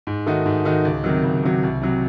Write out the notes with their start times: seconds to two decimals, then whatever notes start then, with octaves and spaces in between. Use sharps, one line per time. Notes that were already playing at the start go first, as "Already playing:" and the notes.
0.07 G#2
0.26 D#3 A3 D#4 F#4
0.46 G#2
0.65 D#3 A3 D#4 F#4
0.85 C#2
1.04 C3 D#3 F#3
1.23 C#2
1.43 C3 D#3 F#3
1.63 C2
1.82 C3 F#3